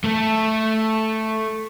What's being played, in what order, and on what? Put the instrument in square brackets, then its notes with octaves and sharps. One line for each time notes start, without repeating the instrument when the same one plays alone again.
[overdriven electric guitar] A3 A4